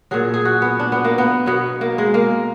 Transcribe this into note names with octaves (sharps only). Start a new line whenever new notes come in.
A#2 F#3 G#4
G#4
F#4
B3
D4
B3
A#3
B3
B2 F#3 B3
A#3
G#3
A#3